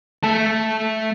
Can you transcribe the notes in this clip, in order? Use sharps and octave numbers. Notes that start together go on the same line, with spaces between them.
A3 A5